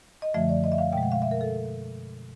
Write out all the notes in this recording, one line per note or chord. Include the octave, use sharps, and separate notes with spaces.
D#5
F#2 D3 F3 A3 E5
D5
D#5
E5
F5
B2 G5
G#3
F#5
F5
E5
A#4
A4